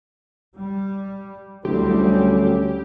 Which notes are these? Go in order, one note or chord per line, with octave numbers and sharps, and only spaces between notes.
G3
D2 D3 F#3 G3 A3 C4 E4 G4
C#4